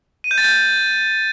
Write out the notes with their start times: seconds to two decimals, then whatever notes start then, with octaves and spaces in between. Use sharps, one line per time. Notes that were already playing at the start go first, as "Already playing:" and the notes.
0.24 D#7
0.31 G6
0.38 A6
0.44 G6